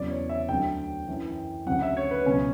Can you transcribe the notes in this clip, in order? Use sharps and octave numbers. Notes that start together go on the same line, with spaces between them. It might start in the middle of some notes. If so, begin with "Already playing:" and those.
Already playing: E2 C#3 F#3 D5
C#5
E5
D2 D3 F#3 G5
F#2 E3
D2 C#3 F#3 F#5
E5
C#5
B4
C#2 B2 F#3 C#4